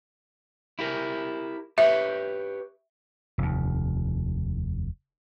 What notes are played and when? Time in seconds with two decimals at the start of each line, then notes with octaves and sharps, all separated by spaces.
0.79 E4 G4 A#4
1.78 G4 B4 C#5 E5
3.38 F1 D#2